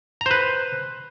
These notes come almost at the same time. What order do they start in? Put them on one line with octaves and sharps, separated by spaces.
A#5 C5 B4